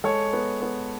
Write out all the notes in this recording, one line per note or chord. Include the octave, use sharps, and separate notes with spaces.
G#3 A4 C#5
B3
B3